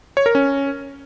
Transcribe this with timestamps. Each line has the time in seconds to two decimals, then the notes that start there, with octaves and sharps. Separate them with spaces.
0.17 C#5
0.26 A#4
0.35 C#4